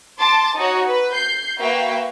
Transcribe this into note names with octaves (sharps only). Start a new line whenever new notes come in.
A5 C6 D6 A6
D#4 F#4 C#5
B4
G6 C7
A#3 F#4 B4 E5 F5 G5